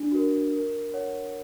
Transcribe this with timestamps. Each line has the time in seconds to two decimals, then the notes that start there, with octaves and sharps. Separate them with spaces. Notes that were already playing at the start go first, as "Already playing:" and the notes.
Already playing: D4
0.11 F#4 A#4
0.53 A#4
0.94 C#5 F#5